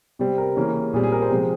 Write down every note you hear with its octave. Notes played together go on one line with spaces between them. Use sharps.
C3 G3 C4
A#4
C#3 E3 A#3 C#4
A#2 G3 C4 G#4
G#4
A#4
C5
C3 F3 G#3